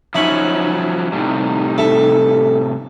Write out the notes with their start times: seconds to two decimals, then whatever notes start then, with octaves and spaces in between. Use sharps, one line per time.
0.15 F3 F#3 C#4 D#4 E5 B5 C#6
1.12 A2 C3 G3 D#4
1.78 A4 E5